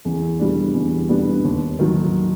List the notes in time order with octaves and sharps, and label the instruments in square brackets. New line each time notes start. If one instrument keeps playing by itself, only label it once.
[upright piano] E2
B2 G3 B3 D4
E2
B2 G3 B3 D4
D#2
D#3 F#3